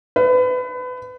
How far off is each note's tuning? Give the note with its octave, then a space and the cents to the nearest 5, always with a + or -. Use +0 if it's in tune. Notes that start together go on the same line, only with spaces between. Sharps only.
B4 +30